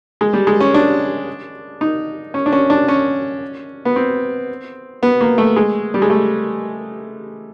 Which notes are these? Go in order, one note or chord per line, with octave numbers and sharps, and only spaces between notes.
G#3
G3
G#3
C#4
D4
D#4
C#4
D4
C#4
D4
C#4
B3
C4
B3
A#3
A3
G#3
G3
G#3
A3